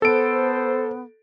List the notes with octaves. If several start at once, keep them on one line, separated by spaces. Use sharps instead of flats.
B3 A4 C5 D7